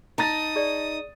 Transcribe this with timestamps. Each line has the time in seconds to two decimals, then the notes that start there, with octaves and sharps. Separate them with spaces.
0.18 D#4 A5 A#5 D#6 A6
0.56 G#4 D5